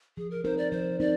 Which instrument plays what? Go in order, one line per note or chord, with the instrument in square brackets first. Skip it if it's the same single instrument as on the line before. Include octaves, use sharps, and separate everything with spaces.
[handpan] F3 [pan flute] G#4
[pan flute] A#4
[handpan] C4 D#4 A#4 [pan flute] C5
[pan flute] D5
[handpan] F3 [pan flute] C5
[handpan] C4 D#4 A#4 [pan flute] D5